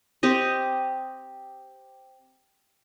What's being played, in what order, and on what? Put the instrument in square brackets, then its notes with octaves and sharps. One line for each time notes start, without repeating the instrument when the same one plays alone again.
[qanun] C4 G4 D#5